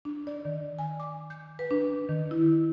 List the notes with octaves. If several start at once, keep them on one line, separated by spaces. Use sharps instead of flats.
D4
D5
D#3
G#5
D6
G6
B4
D4
D#3
E4